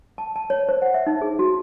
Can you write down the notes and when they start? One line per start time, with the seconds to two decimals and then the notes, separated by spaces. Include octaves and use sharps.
0.18 A5
0.36 A5
0.50 C#5
0.69 C5
0.82 F#5
0.94 E5
1.07 D#4
1.22 G#4
1.39 F#4